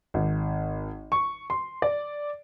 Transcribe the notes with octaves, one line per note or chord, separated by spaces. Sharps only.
G#1
C#6
C6
D5